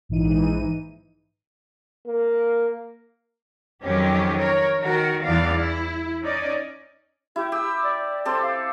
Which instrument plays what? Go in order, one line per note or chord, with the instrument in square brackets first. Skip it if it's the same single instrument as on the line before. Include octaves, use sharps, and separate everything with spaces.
[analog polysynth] A#1 G#2 E3 D#4 D#7
[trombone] A#3
[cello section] F2 D#3 F#3 C#4 G4
A#4 C#5
D#3 F#4 A#4
E2 E3 G3 B3 D5 F5
E4
C#4 D#4 D5 D#5
[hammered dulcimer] E4 [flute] G4
[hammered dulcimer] G4 [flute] E6
[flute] D5
[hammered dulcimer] C4 G4 A4 [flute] C6
[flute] F5